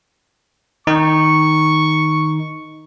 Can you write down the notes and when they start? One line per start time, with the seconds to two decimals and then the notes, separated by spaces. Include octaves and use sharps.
0.87 D#3 D#4 C#6